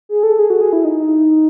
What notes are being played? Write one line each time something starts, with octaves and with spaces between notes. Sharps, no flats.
G#4
A4
G#4
F#4
G#4
E4
D#4